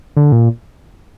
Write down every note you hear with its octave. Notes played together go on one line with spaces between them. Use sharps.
D3
A#2